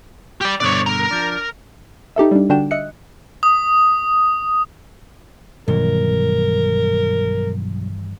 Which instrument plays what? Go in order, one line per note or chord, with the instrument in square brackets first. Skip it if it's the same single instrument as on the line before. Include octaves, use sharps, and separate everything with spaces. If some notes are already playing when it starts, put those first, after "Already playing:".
[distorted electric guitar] G4 D5
[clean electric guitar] G2 B2 D3 [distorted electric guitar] C#5 D5
[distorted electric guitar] A#4 A#5
[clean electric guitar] F3 D4
[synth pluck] D#4 G4 A4 E5
G3 D4
D3 D4 F#4 G5 E7
D#5 E5 F#6 C#7
[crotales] D#6
[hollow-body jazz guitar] B1 [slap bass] G2 D#3 E3 [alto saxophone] A#4